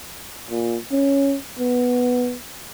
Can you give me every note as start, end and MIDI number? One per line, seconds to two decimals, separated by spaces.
0.50 0.77 46
0.92 1.36 61
1.59 2.36 59